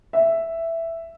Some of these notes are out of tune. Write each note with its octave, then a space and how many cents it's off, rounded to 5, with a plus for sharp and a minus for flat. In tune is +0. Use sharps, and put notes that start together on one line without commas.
E5 +5